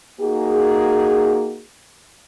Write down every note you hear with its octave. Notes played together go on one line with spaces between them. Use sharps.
A#3 D#4 F#4 G#4